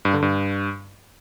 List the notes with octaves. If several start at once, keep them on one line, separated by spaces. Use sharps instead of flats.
G2
D3
G2